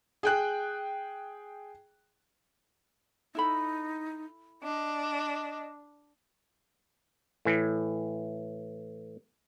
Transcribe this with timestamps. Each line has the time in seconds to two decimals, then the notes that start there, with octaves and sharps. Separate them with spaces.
0.23 G#4 G5 F#6
3.35 D#4 E4 A4 B5
4.62 D4 D#5
7.45 A2 E3